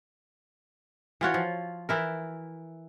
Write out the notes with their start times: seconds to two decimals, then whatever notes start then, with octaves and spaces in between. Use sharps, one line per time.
1.21 E3 F4 F#4 C#5
1.34 F3
1.89 E3 E4 A#4